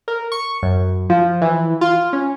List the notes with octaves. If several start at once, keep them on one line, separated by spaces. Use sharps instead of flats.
A#4
C#6
F#2
F3
E3
F4
C#4